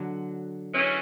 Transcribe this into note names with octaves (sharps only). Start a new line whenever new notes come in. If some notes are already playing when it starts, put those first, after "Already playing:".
Already playing: D3 F#3
E3 G#3 C#4 F#4 B4